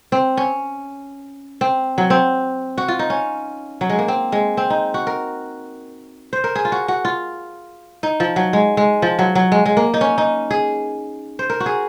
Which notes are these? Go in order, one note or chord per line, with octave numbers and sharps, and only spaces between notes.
C4
C#4
C4
F#3
C4
F#4
F4
D#4
C#4
F#3
G#3
A#3
C4
G#3
C4
D#4
F#4
A#4
C5
A#4
G#4
F4
F#4
F#4
F4
D#4
F3
F#3
G#3
G#3
F3
F#3
F#3
G#3
G#3
A#3
D#4
C#4
D#4
G#4
C5
A#4
F#4
G#4